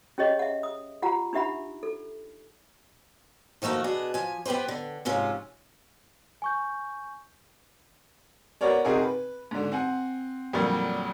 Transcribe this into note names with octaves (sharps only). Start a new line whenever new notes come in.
C#4 G4 G#4 C#5 D#5
E5 F#5
D#6
F4 G4 F#5 A#5
D4 D#4 G4 E5 F#5 B5
A4
D#3 F3 A3 A#3 F#4
B2 D4 G#4
F3 G#5
B3 G4 G#4 B4 C5
D3
G#2 C3 F3 C#4 F4
G#5 C#6 G6
B3 F#4 A#4 C#5 D5
C3 C4 D#4 F#4 G#4 A#4
B4
G#2 D3
C4 F#5 G#5
F2 A#2 D3 F#3 G3